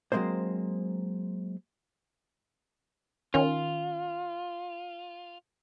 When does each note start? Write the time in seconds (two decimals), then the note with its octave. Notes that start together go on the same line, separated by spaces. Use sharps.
0.12 F#3 G#3 A#3 C4 C5
3.34 D#3 C#4 F4